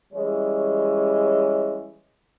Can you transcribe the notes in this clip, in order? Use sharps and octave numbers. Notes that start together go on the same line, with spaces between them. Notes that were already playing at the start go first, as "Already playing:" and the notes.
E3 G3 G#3 C#4 C#5